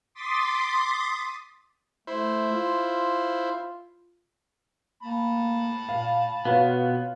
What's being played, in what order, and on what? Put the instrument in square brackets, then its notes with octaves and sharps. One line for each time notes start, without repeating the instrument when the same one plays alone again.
[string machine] C6 D6 D#6 A6 B6
[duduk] A3 [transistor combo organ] E4 C5
[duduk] F4
[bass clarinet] A#3 [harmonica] A5 B5
[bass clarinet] A#2 [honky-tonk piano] F5
[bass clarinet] B2 [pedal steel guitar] B3 [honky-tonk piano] F4 B4 C#5